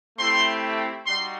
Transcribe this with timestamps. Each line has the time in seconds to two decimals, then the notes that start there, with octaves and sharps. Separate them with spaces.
0.18 A3 C4 E4 G4 C6
1.06 G3 D#4 F#4 C6